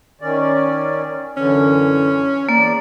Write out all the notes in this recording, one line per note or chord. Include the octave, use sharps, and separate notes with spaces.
D#3 C#4 D5
F#2 D3 E3 C#4
E2 A#3 D5